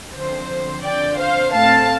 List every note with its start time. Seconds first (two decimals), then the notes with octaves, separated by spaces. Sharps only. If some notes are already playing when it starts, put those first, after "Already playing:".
0.14 D3 F3 C4 C5
0.83 D3 F3 C4 D5 G5
1.18 C5 F5
1.53 A2 A3 C4 F5 A5